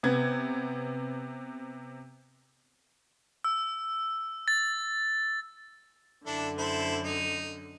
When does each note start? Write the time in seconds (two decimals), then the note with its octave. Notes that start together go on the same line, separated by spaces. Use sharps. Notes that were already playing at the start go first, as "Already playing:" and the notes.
0.03 C3 B3 G#6
3.44 E6
4.48 A6
6.26 F#2 D3 D4 E4 A4
6.58 E4 A4 C5
7.04 D#4